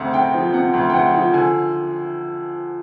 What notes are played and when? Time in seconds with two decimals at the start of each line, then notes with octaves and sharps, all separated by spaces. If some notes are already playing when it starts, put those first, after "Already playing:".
Already playing: D2 C3 F#5
0.14 D2 G5
0.34 F3
0.53 C3 F#5
0.74 D2
0.90 G5
0.94 D2 F#5
1.14 F3
1.33 D3 G#5